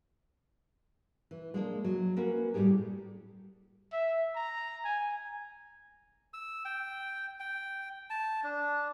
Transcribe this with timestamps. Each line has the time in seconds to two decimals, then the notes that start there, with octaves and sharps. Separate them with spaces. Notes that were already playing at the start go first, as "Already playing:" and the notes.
1.31 E3
1.54 G#3 A#3 D4
1.84 F#3
2.17 A#3 C#4 F#4 A#4 B4
2.54 A2 G3 D#4 G4 G#4
3.93 E5
4.36 A#5
4.84 G#5
6.34 E6
6.65 G5
7.40 G5
8.10 A5
8.43 D4